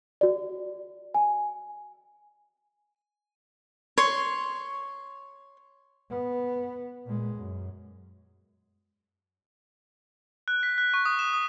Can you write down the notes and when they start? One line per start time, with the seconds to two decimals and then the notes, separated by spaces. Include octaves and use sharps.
0.21 F#4 D5
1.14 G#5
3.98 C#5 C6
6.11 B3
7.05 A#2 G#3
7.35 F#2
10.48 F#6
10.63 B6
10.78 F#6
10.94 C#6
11.05 D#6
11.19 E7
11.33 D#6